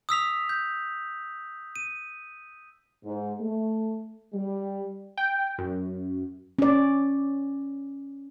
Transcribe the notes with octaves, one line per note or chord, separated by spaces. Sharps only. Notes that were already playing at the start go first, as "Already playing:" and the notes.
D#6 E6 B6 F7
G6
D#7
G#2
A3
G3
G5
F#2
C#4 D5